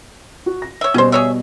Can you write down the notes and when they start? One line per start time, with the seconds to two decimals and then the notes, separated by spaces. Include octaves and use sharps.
0.46 F#4
0.62 A#6
0.81 C#5 E5
0.94 B2 G3 C#4 C5
1.12 G#4 C#5 E5